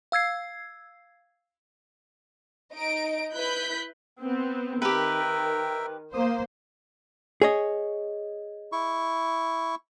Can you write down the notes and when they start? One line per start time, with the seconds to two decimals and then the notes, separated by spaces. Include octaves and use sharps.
0.12 F5 E6 G#6 C7
2.74 D#4 D#5 D7
3.33 E4 B4 F#6 G6 B6
4.20 B3 C4
4.82 D#3 G4 A#4 B4 E5 G5
6.14 A#3 C5 D#6
7.42 G#4 C#5 D#5
8.72 E4 C#6